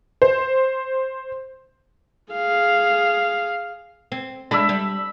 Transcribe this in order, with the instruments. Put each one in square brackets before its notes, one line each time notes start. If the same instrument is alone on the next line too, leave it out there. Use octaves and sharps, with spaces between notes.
[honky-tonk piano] C5
[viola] G#4 F5
[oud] C4
[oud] G#3 D4 [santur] E5 B5
[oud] G3